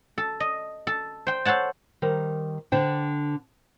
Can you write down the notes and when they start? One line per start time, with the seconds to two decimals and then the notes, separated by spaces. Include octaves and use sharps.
0.18 A4
0.40 D#5
0.87 A4
1.27 C5 G5
1.45 A4 C5 C#5 F#5 A5
2.02 D#3 G3 A#4 C5
2.72 D3 D4 C5 G5